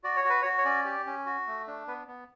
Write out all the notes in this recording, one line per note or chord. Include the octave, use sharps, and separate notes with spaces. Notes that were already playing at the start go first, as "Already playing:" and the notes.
F#4 D5
C#5
F#4
B4
F#4 C#5
C#5
C#4 D5
G4
C#4
F#4
A3
D4
B3 B4
B3